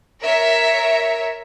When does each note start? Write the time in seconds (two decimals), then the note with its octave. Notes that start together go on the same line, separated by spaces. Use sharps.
0.22 A#4 C#5 E5